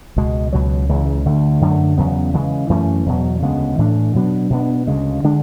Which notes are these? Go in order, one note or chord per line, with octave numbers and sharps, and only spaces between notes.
C#2 B2 G#3
C#2 B2 F#3
C#2 C#3 E3
D2 D3 A3
F#2 D3 F#3 A3
E2 C#3 F#3 B3
C#3 E3 G#3
F#2 E3 A3 C#4
E2 B2 F#3
D2 C#3 G#3 B3
A2 E3 A3 D4
B2 F#3 B3 D4
B2 G#3 B3 D4
D2 C#3 G#3
D3 G#3 D4